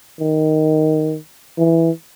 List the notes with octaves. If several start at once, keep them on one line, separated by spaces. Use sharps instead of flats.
D#3
E3